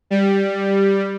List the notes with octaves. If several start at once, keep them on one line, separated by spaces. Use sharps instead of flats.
G3